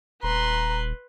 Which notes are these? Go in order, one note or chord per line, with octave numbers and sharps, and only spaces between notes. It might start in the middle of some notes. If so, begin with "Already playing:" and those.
D#1 B4 A#5 C6